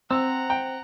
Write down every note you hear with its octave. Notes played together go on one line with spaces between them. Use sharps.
C4 F#5 A#5 E6
G5